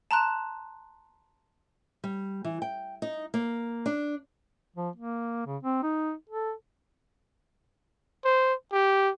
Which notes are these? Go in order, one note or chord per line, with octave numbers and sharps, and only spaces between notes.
A5 A#5 C6 F#6 E7
G3
E3
G5
D#4
A#3
D4
F3
A#3
C#3
C4
D#4
A4
C5
G4